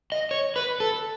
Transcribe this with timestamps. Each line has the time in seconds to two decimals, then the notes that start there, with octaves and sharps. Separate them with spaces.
0.12 D#5
0.31 C#5
0.56 B4
0.80 A4